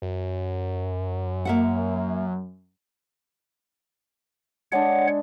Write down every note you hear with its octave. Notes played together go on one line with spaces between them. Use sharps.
F#2
A#3 E5 F#5
G#3 D4 C#5 F#5